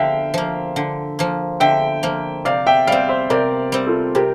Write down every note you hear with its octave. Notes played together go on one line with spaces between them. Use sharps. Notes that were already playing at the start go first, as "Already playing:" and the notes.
Already playing: D3 F3 A#3 E5 F5 G5
F3 A#3
D3
F3 A#3
D3 E5 G5
F3 A#3
C3 D5 F5
E5 G5
G3 C4 D5 F5
C5 E5
C3 A#4 D5
G3 C4
F4 A4
C3 G4 A#4